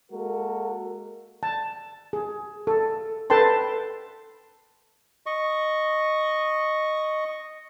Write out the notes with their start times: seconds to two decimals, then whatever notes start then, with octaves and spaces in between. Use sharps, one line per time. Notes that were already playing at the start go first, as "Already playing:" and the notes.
0.12 G#3 A#3 F#4 A4 A#4
1.43 A5
2.13 G#4
2.67 A4
3.30 A4 B4 G5 A5 C6
5.26 D#5 C#6